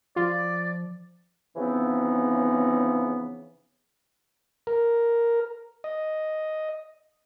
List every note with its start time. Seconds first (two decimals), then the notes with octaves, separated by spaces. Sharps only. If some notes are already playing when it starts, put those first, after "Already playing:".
0.16 F3 F4 D5
1.56 C#3 E3 F3 B3 C4 D#4
4.67 A#4
5.84 D#5